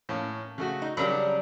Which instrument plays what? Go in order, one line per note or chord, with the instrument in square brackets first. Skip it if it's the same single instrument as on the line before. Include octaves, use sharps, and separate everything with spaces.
[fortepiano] A2 A#3 C#4
C#3 A3 F#4
[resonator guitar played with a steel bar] D#4
[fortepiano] C#3 A#4 B5 [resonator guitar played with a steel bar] F#3 G3 D4